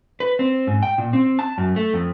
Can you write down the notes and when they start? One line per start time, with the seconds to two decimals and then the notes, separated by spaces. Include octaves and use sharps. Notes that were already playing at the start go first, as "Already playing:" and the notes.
0.20 B4
0.39 C4
0.67 G#2
0.83 G5
0.98 A#2
1.13 C4
1.39 A5
1.58 F#2
1.76 A3
1.94 F2